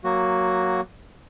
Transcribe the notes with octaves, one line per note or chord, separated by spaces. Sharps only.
F#3 A#3 F#4